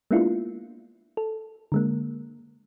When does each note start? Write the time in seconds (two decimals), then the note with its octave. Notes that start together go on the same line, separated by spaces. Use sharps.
0.11 G#3 A#3 B3 D4 E4 F4
1.17 A4
1.72 D3 G#3 A#3